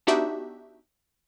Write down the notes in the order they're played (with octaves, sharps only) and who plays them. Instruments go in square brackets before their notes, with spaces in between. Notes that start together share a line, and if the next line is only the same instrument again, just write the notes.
[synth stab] B3 D4 D#4 F#4 G4 E5